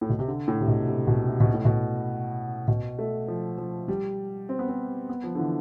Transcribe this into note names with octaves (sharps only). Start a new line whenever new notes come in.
A2
B2
C3
D3
A2
C3
B2
C3
B2
C3
B2
A2
B2
B2
A3
F3
F3
G3
C4
B3
C4
B3
F3
D3
E3